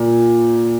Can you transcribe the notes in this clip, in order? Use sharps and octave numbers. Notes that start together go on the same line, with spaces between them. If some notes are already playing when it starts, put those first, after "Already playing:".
Already playing: A#2